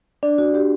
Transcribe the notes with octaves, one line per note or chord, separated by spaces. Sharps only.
D4 D5
D4 F#4
F#4 G4